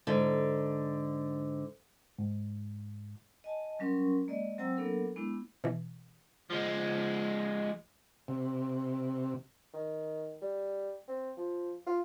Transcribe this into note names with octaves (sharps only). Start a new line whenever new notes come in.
G#2 D3
G#2
D#5 G#5 A5
F#3 G3 C#4 A#4 C6 C#6
G#3 A#3 D5 D#5
F#3 C4 C5 G5 A#5 E6
F#3 A#3 B3 D4 A4 A#4
G#3 B3 D4 E4
B2 E3
F3 G#3
C3
D#3
G3
C4
F3
F4